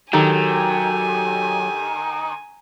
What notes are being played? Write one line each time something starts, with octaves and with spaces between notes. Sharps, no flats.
D#3 F#3 G4 A4 G5 G#5